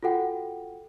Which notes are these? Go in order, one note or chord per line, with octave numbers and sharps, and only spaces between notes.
F4 F#4 A4 F#5 G5